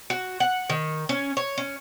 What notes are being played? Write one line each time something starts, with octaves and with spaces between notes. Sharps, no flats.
F#4
F#5
D#3
C#4
C#5
C#4